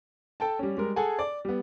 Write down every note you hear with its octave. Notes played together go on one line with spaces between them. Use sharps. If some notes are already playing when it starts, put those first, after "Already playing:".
A4 G5 A5
G3 C#4
G3 G#3 A#4
G#4 A4 F#5 G#5
D5
G3 B3